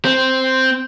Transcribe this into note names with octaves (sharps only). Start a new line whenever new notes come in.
C4